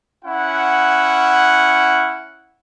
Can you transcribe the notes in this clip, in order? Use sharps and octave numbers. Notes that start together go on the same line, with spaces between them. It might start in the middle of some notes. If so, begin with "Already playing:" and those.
C#4 E4 F#5